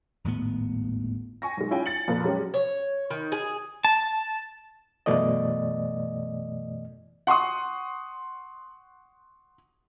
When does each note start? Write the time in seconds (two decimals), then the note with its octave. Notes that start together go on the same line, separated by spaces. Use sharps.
0.24 D#1 G#1 A2 B3
1.42 G5 G#5 C#6 A#6
1.57 B1 G#3
1.71 C#4 E4 F4 G5 G#5
1.86 A6 C#7 F#7
2.08 F2 A#2 A#3 A4 B4
2.24 F#3 G#3 C#4 G4
2.54 C#5
3.10 D#3
3.32 G#4
3.85 A5
5.06 F#2 B2 E3 A3 D5 D#5
7.27 F#5 C6 C#6 D#6